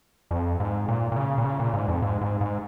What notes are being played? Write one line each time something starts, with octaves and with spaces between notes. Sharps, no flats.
F2
G#2
A#2
A#2
C#3
A#2
C#3
A#2
G#2
F2
G#2
G#2
G#2